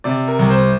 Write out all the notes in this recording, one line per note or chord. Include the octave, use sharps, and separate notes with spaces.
C3 D5
A#4
C2
C5